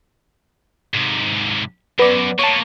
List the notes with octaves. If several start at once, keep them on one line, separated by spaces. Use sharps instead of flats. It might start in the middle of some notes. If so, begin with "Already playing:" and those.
G#2 C3
F#2 B3 D5
A#3 B3 C#5 A5